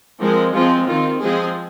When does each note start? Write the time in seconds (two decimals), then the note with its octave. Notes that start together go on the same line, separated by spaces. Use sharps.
0.21 F3 G#3 C4 A#4
0.54 F3 G#3 C4 F4
0.88 D#3 C4 F4
1.21 F3 G#3 C4 G#4